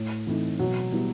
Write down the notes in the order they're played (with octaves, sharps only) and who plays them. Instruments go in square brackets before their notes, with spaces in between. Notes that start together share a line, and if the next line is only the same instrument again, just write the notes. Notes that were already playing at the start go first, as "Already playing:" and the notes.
Already playing: [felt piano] A2
E3 A3 C4 D#4
[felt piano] B2 [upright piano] F#3
[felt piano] G3 B3 E4